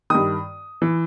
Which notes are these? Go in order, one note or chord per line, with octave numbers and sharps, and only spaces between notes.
G2 D#3 D#6
E3